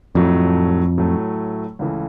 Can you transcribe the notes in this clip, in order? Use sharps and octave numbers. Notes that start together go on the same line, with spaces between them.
F2 A2 F#3 A3
A2 F#3 A3
C#2 C#3 E3 A3